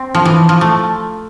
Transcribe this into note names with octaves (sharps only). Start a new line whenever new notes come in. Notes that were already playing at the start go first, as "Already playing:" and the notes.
Already playing: C4
F3
E3
F3
A3